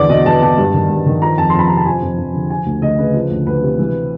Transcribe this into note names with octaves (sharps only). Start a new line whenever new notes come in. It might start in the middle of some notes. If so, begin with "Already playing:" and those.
Already playing: E2 D3 D5
B2 D#5
E2 A5
B2 A5
G2
D#3
G2
D#3
F3 A#5
F2 A5
C6
F2 B5
C3 A#5
A5
F3 G#5
F2
F2
D3
F3 G#5
D2
D2 D#5
C#3 B4
F3
D2
D2 B4
C3
E3